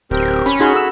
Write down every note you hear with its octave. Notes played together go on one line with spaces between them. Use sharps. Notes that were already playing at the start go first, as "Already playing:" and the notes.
D1 C4 G4 A#4
C#4 B5
D#4 F#4 G#4 B5 C6
A4 E6